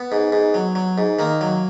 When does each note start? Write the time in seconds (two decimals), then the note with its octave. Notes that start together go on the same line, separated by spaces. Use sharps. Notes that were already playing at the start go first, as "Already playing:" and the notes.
Already playing: B3
0.12 G#2
0.32 G#2
0.54 F#3
0.75 F#3
0.98 G#2
1.19 D#3 A#3
1.41 F#3